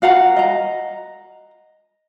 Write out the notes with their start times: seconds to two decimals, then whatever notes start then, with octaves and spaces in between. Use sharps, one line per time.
0.02 F#4 F5 F#5 A#5
0.36 D#5 A#5